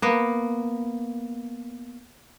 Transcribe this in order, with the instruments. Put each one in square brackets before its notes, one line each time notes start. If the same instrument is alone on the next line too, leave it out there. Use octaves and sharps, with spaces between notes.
[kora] A#3 B3